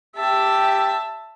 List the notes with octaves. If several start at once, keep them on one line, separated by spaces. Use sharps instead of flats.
G4 E5 A5